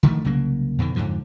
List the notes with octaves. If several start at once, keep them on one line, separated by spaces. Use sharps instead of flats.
D3 D#3 F3 A3
C2 C#3 F#3 A#3
F2 B2 D3 D#3
F2 G#2 D3 F3